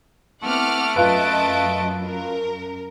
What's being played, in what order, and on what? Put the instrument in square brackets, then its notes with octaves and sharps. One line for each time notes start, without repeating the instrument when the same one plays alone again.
[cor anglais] A3 [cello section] B3 C4 E4 [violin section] F#5 D6 F6
[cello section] F#2 [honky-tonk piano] F4 B4 [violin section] D#5 A5 D7
[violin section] A#4